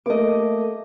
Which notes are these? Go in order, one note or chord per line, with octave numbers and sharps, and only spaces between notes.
A3 A#3 D#5 D6